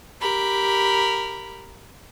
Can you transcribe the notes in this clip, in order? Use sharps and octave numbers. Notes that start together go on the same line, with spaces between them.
G4 A#4 B5